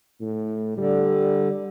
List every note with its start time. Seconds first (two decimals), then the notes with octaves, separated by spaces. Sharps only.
0.21 A2
0.77 D3 G3